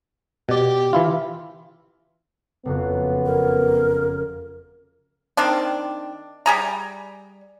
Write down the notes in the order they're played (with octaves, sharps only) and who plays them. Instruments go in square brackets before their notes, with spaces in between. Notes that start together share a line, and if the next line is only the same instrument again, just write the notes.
[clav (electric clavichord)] B2 D5 [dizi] G4
[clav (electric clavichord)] E3 E4 F4
[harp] F#1 F2 F#6 [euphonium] B3
[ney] A#4
[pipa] D#3 C4 D4
G3 G#4 A#5